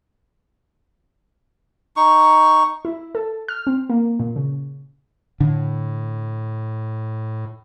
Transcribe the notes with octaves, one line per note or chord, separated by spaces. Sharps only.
D#4 C#6
E4
A4
F6
C4
A#3
A#2
C#3
A2 D3